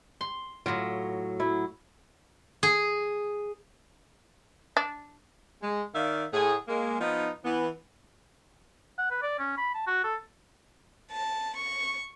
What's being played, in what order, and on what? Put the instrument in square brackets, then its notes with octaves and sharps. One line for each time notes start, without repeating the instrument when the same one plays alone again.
[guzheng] C6
[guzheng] A2 F#3 [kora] F4
[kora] F#3 E4
[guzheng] G#4
[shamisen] D4
[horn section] G#3
D#3 D5 E5 F5
A2 G#4
G#3 A#3
F3 B3 D#4
E3 B3
[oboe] F#5
B4
D5
C#4
B5
A5
F#4
A4
[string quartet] A5
C#6